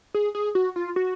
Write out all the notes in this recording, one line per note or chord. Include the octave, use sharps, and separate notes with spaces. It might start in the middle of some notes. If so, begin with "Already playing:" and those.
G#4
G#4
F#4
F4
F#4